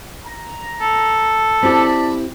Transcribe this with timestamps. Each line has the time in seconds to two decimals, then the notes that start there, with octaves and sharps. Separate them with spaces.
0.25 A#5
0.79 A4
1.63 C4 E4 G4 D5 A5 B5